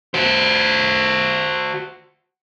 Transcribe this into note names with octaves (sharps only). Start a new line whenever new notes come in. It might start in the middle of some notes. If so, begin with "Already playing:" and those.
F#4 C5